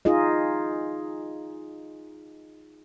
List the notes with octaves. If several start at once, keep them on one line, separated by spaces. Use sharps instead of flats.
D#4 F4 G#4 D#5